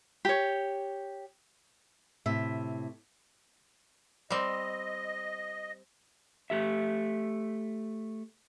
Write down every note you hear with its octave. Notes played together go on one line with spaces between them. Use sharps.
G4 C#5
A2 C3 E5
G3 C4 D#5
A3 G4 E5